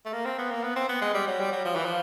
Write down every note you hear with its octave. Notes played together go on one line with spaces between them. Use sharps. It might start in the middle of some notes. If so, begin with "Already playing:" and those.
A3
A#3
C4
B3
A#3
B3
C4
B3
G#3
G3
F#3
G3
F#3
F3
E3
F3